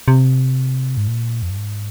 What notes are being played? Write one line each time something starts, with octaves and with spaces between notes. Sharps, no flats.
C3
G#2
A#2
F2
G2
G#2